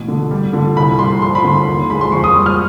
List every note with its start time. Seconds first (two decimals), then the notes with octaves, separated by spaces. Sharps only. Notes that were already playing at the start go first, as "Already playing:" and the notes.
Already playing: A1 B2
0.08 D3
0.31 G3
0.53 D3
0.76 C2 B5
0.99 G3 C6
1.22 F3 C6
1.35 B5
1.44 D3 C6
1.67 D#2
1.90 G#3 B5
2.01 C6
2.12 F2 C#6
2.24 D#6
2.35 G3
2.46 F6